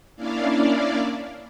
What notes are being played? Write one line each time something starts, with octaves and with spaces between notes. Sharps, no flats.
A#3 C#4 D4 E4 D5 F5